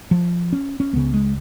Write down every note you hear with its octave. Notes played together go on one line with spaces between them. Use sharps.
F3
C#4
C#4
C#2 C#3 B3
G#3